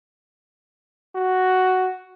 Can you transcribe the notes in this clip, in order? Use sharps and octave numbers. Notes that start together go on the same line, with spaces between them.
F#4